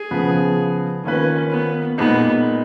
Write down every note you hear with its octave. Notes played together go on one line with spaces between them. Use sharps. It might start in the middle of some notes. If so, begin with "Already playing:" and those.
Already playing: G#4
C#3 F3 B3
D#3 A#3 C#4 F4 B4
B3
A#2 G#3 B3 D#4